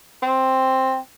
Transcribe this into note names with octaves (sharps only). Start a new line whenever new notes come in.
C4